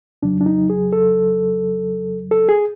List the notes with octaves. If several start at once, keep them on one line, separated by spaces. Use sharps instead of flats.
F2 C#3 F#3 D4
D4
D#4
G#4
A4
A4
G#4